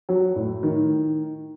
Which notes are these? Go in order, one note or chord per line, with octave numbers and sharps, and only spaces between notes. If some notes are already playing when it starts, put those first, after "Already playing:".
F#3
A2
D#3